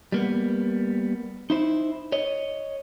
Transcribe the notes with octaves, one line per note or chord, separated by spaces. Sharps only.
G3 A#3 B3
D#4 E4 C5
C#5 D#5